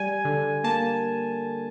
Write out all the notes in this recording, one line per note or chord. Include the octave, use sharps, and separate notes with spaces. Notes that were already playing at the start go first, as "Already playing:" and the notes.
Already playing: G3 G#5
D3
A#3 A5